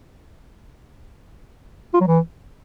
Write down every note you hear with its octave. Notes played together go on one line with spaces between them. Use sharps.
F4
F#3
E3